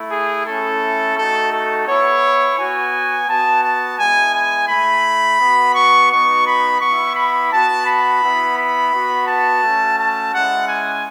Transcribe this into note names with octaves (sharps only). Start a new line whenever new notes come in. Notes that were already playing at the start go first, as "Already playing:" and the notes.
Already playing: A3 E4
G#4
A3 C#4 E4 A4
A3 D#4 F#4 A4
A4
B3 E4 C#5
B3 F#4 G#5
B3 F#4 A5
A5
G#3 B3 E4 G#5
G#5
A3 E4 B5
B3 F#4
C#6
B3 D#4 F#4 C#6
B5
B3 E4 C#6
B5
B3 F#4 A5
B5
B3 E4
B5
B3 F#4
A5
A3 C#4 F#4
A5
G#3 C#4 E4 F#5
G#5